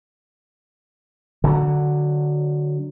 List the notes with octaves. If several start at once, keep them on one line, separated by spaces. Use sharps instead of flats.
D3 F#3